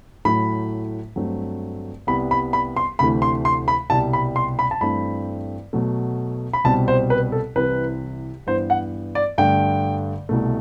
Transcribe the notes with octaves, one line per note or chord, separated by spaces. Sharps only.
A2 F#3 A3 B5
G2 F#3 A3 C4
C2 C3 G3 B3 B5
B5
B5
C6
D2 C3 E3 A3 B5
C6
C6
B5
C2 B2 G3 A5
B5
C6
B5
A5
G2 E3 A3 C4 B5
B2 F#3 A3
B5
C2 B2 G3 C4 A5
C5
B4
A4
C2 C3 E3 B4
G2 E3 B3 C5
F#5
D5
G2 D3 A3 G5
C2 B2 A3